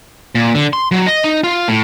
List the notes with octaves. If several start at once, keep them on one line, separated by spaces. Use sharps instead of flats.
A#2
D3
C6
F#3
D#5
D#4
F4
A2